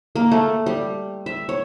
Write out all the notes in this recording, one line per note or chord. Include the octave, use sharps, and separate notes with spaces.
A#3
A3
G3
E5
C#5